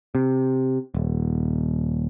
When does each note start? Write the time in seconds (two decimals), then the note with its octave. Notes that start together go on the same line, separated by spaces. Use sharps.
0.15 C3
0.95 D#1